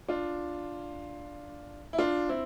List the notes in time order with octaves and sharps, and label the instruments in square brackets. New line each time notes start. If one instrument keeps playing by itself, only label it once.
[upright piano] D4 F4
E4
D4 F4
C4 E4